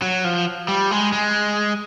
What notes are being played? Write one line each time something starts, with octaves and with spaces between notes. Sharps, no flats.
F#3
F3
G3
G#3
G#3